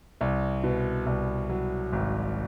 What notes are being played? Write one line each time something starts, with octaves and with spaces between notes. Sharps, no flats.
C2
B2
C2
F#3
G#1